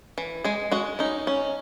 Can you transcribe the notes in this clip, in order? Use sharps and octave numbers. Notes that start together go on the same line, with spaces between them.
E3
G#3 G#4
G#3 F#4
C#4 D#4
C#4